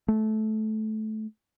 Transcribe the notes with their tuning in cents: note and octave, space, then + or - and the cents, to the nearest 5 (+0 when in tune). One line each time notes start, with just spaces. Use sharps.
A3 -20